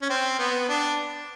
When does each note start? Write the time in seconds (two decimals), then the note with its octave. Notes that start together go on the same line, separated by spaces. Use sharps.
0.02 C#4
0.09 C4
0.39 B3
0.69 D4